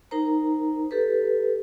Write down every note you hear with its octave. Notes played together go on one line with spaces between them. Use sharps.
D#4 A#4 C5 A#5
G4 A4 B4